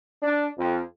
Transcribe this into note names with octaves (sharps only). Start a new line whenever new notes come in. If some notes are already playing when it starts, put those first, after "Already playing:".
D4
F2